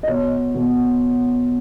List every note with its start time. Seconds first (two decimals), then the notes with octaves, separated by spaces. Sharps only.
0.03 D#5
0.08 B2 C#5
0.54 B2